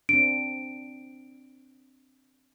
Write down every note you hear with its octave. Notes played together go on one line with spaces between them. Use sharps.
C4 D4 D7